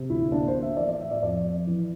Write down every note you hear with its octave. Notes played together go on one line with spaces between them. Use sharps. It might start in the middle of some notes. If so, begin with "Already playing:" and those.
Already playing: C3
D2 E4
A#3 D4
C5
A#3
E5
E3 D5
D5
A2 E5
D5
F2 D5
F2
E3